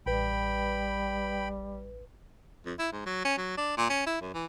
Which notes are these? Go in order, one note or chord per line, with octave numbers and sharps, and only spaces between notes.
A1 G3 B4 G5 B5
F2
E4
G#2
F#3
C#4
F#3
D4
A#2
C#4
E4
F#2
E3